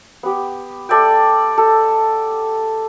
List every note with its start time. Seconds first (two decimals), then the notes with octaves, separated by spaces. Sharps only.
0.23 B3 G4
0.89 A4 D5 E5 G5
1.58 A4